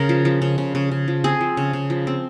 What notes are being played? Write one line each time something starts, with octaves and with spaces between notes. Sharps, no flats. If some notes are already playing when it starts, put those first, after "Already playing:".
Already playing: C#3 A#4
F3
F3
C#3
C#3
C#3
C#3
F3
C4 G#4
F3
C#3
C#3
F3
C4